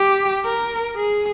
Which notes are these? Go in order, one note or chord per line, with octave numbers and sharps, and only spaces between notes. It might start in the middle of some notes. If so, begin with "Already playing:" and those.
Already playing: G4
A#4
G#4